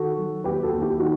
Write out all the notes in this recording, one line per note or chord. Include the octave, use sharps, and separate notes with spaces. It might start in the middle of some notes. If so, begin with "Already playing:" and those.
Already playing: D#3 F#4 A4
F#3
D#2 G4 B4
F#4 A4
D#2
E4 G4
D#3 D#4 F#4